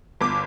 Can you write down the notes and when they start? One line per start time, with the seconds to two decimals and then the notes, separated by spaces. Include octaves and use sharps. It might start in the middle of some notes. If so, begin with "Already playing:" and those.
0.21 G1 D6